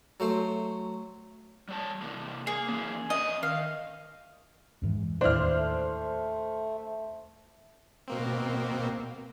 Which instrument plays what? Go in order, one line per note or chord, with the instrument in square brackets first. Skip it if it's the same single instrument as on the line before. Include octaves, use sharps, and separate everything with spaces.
[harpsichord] F#3 A3 C5
[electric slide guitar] G3 C#5 A5
C3 E3 A#3
[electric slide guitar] A#3 [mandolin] G#4
[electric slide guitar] E3 A#3 C#4
[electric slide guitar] C#4 E5 [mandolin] D#5
[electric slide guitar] D#3 [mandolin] F5
[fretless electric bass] F2 G#2 E3
[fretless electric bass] D#2 A2 [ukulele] D4 E4 [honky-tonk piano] C5 F6
[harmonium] A3
[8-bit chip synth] B2 A#3 C4